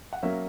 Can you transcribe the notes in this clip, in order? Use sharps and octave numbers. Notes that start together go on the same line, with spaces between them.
F#5
F#3 A#3 C#4 E5